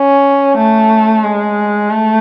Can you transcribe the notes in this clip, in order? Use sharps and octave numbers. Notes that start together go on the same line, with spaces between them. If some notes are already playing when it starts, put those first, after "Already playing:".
Already playing: C#4
A3
G#3
A3